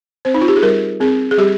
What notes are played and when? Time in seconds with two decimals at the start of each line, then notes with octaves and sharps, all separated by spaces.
0.25 C4 C5
0.34 D#4
0.41 F4
0.48 G4
0.56 G#4
0.62 G3 A#4
1.00 C4 G#4
1.31 G#4
1.38 G3 G4